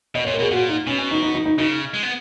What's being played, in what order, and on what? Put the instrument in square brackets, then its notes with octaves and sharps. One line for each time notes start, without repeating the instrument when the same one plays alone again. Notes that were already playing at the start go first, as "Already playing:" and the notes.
[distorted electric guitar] B2 [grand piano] D#5
[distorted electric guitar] A#2 [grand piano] C#5
[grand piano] A#4
[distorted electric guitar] B2
[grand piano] G#4
[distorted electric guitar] A#2 [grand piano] F#4
[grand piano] D#4
[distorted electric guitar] B2 [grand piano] C#4
[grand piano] C#4
D#4
D#4
D#4
D#4
[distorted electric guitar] C#3 [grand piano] D#4
[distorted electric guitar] G#3
B3